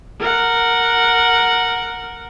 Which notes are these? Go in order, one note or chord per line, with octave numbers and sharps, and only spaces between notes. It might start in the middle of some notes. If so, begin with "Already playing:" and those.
A#4 F#5